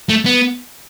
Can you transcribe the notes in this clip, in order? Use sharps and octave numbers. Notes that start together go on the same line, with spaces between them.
A3
B3